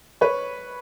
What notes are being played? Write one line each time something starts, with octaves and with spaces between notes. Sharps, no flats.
B4 C#5